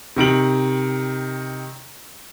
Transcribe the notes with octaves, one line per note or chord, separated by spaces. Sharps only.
C3 D#3 D7 F#7